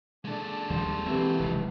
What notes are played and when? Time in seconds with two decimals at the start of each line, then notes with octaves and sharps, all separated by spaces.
0.25 G#3 D4 A4 D5
0.70 D#2 F3 G3 C5
1.07 E3 F#3 C4 G4 B4 E5
1.40 F1 C#2